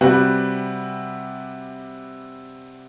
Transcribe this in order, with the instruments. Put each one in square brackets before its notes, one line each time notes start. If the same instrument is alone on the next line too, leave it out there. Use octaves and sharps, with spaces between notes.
[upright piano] C3 G3 F#4 B4